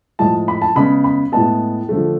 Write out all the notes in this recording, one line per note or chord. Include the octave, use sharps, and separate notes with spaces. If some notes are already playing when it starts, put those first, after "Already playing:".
A2 F3 G#3 A5
B5
A5
C#3 G#3 B3 B5
B5
A2 G#3 B3 A5
D3 F3 A3